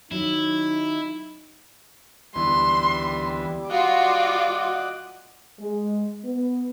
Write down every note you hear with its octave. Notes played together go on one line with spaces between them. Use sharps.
D#3 F#3 C#4 D#4 E4
D2 E3 G3 B3 C6
F4 F#4 D5 D#5 F#5 D6
G#3
B3